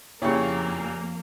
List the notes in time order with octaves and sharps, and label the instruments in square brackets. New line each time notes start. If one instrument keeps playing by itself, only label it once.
[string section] F2 A#3 [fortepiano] A#2 C#3 [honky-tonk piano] E4 G4 [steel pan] C#5 C#6